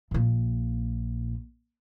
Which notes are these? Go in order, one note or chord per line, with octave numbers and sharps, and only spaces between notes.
A#1 A#2